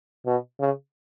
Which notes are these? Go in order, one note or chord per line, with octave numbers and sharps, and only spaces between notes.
B2
C#3